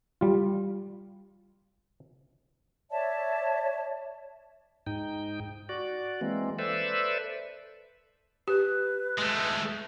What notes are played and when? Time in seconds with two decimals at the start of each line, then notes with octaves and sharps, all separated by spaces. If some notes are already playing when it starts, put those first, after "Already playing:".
0.21 G3 F4
2.90 C#5 D5 E5 A5
4.87 G#2 D#4 G5
5.69 F#4 D5
6.21 E3 G#3 A#3 C4
6.59 A4 B4 C5 D5 E5
8.48 G4 B4
9.19 G#3 A3